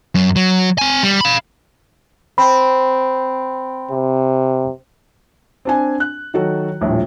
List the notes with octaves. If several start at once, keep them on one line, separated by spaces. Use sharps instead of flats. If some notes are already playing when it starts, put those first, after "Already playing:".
F#2
F#3
C4 G#5
G3
F5 B5
C4 B5
C3
C4 D4 G#5
F#6
D#3 F#3 F#4 A4
D#1 A#1 A2